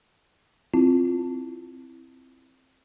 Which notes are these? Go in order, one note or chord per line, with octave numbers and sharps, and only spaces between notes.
C4 E4 F4